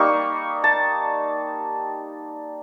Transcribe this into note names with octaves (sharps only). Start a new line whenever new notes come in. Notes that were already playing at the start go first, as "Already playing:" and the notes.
Already playing: G3 A#3 D#4 C#6
A5